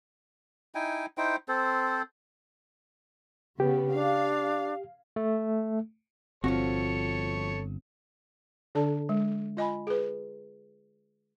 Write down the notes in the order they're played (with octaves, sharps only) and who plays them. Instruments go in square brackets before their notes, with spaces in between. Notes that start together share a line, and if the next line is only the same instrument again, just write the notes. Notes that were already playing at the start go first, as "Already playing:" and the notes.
[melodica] D#4 E4 G5 G#5
D#4 E4 C5 G5
C4 A4 C5
[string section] C#3 B3 [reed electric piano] G4
[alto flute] D4 [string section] F5
[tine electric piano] A3
[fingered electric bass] G1 [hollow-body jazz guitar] F3 F#4 [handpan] C4 [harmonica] A4 C#5
[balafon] D3 D4 A4 D5 A5
G#3
F4 D#5 G#5 B5
G#4 B4